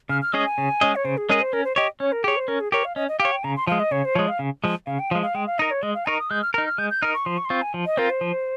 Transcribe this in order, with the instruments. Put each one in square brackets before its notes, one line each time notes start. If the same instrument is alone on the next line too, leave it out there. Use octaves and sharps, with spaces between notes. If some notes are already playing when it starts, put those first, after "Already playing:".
[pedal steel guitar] C#3 [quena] F6
[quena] F6
[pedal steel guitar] G#3 C#4 G#4 D#5 [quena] D#6
[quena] G#5
[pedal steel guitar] C#3
G#3 C#4 G#4 D#5
[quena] C#5
[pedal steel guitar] C#3 [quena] C5
[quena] G#4
[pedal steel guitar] G#3 C#4 G#4 D#5 [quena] A#4
[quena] C5
[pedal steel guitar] C#4 [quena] A#4
[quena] C5
[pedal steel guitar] G4 C#5 [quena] D#5
[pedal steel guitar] C#4 [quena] C#5
[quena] A#4
[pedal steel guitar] G4 C#5 [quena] G#4
[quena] C5
[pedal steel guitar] C#4 [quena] A#4
[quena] G#4
[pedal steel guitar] G4 C#5 [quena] A#4
[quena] F5
[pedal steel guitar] C#4 [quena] D#5
[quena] D#5
[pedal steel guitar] G4 [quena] F5
[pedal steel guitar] C#5
[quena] G5
[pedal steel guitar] C#3 [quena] A#5
[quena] C6
[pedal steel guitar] F3 G#3 [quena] F5
[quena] D#5
[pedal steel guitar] C#3 [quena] C#5
[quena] C5
[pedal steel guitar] F3 G#3 [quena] C#5
[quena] F5
[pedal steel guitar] C#3
F3 G#3
[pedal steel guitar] C#3 [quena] F5
[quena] G5
[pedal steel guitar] F3 G#3 [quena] F5
[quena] F5
[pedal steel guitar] G#3 [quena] G5
[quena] F5
[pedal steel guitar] D#4 A#4 [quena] D#5
[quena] C#5
[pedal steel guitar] G#3 [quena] D#5
[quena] F5
[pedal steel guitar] D#4 A#4 [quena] C#6
[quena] D#6
[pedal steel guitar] G#3 [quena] G6
[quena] F6
[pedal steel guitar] A#4 [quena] F6
[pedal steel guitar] D#4
[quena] F6
[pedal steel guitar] G#3 [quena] G6
[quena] G6
[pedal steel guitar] D#4 A#4 [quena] F6
[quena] C#6
[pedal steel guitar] F3 [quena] C6
[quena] C#6
C6
[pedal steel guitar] C4 F4 [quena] C#6
[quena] G#5
[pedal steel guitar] F3
[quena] D#5
[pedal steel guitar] C4 F4 [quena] A#4
[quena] C5
[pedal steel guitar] F3